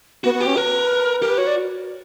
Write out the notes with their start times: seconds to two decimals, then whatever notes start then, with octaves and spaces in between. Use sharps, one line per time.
0.24 B3 F#4
0.34 B3
0.40 G4
0.47 C#4
0.56 A#4 B4
1.21 G4 A#4
1.30 B4
1.38 F#4 C#5
1.47 D5